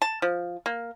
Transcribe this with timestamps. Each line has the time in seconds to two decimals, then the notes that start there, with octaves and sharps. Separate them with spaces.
0.02 A5
0.22 F3
0.66 A#3